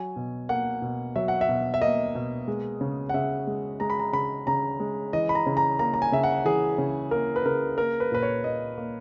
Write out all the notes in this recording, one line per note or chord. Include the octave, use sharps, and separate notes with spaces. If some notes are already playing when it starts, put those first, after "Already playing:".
Already playing: F#3 G#5
B2
A#3 F#5
B2
F#3 E5
F#5
E5
B2
E5
A#3 D#5
B2
G#3
C#3
F#5
C#3 E5
G#3
G#3 A#5
B5
A#5
C#3 B5
C#3 A#5
G#3
E3 D#5
B5
A#5
C#3
A#5
A#3 A#5
A#5
G#5
C#3 E5
F#5
E3 G#4
C#3
A#3 A#4
B4
C#3 A#4
A#3 A#4
B4
A#2 B4
C#5
A#2 D#5
A#3